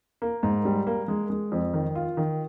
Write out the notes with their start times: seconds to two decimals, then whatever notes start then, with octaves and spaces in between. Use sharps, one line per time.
0.22 A#3
0.43 G#2
0.65 G3
0.87 A#3
1.08 G#3
1.30 G#3
1.52 F2
1.74 D#3
1.95 F4
2.17 D#3